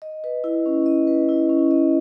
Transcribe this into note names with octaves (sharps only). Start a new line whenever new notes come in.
D#5
B4
E4
C#4
D#5
B4
E4
C#4
D#5